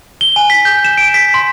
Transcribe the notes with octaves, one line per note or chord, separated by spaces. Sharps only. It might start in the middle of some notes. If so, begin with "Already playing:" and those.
G7
G#5
B6
G6
E7
D7
B6
C6